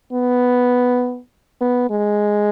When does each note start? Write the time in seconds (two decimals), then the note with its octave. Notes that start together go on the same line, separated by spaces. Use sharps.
0.13 B3
1.61 B3
1.91 G#3